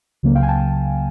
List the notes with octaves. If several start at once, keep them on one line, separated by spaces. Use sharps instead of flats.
C#2 C#3 F#3 A#3
F5 G5
G#5
G5 A5